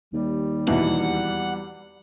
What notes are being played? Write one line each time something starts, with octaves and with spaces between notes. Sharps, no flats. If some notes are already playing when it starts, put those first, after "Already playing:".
D#2 G3
E2 B2 E3 F#5